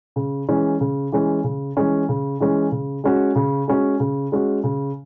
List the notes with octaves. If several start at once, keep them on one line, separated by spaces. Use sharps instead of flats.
C#3
E3 G#3 C#4
C#3
E3 G#3 C#4
C#3
E3 G#3 C#4
C#3
E3 G#3 C#4
C#3
G#3 C#4 F#4
C#3
G#3 C#4 F#4
C#3
G#3 C#4 F#4
C#3